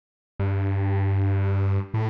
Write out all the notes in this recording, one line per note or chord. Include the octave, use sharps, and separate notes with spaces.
G2
A2